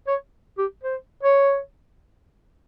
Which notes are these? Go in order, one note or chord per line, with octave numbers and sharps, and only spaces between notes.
C#5
G4
C5
C#5